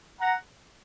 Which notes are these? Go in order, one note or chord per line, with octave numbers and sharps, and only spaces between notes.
F#5 A#5